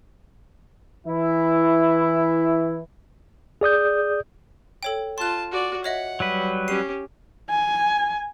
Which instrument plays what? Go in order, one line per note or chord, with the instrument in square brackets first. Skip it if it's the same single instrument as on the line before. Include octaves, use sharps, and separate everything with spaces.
[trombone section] E3 E4
[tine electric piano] G#4 D5 D#6 G6
[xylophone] A4 C#5 G5
[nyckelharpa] F4 A5 [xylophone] C6 F#6
[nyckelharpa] F#4 D5
[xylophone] C#5 D#5 E5 [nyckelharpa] F#5
[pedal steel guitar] F#3 G3 B4
[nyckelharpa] C#4 G4 [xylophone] C7 D#7
[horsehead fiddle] G#5